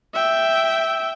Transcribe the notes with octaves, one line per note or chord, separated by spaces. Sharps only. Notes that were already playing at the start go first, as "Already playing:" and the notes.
E5 G5